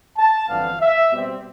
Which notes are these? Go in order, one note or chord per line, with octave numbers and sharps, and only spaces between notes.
A5
G1 F2 E3 B3 D4 F5
E5
B2 G3 C4